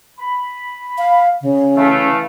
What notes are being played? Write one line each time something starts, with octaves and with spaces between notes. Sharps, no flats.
B5
F5
C#3
E3 A3 F5